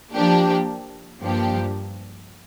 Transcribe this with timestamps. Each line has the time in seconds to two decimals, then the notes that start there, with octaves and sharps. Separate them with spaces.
0.13 F3 A#3 D4 G4
1.20 G2 F3 A#3 D4 G4